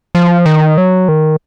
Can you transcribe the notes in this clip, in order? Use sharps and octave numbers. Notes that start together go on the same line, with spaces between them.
F3
D#3
F#3
D#3